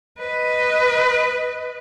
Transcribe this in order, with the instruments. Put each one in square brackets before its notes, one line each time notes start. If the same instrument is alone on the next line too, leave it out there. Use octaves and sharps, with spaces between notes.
[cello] B4 D#5